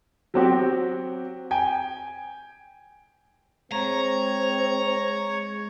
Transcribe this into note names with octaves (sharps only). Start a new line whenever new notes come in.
F#3 C4 F#4 G4
G5 G#5
G#3 C4 C#5 A#5